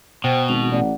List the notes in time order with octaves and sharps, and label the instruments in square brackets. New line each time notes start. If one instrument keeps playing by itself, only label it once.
[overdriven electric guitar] B2 [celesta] C5 G5
[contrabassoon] G#1 [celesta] F7
[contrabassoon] A1 [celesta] D5 F#5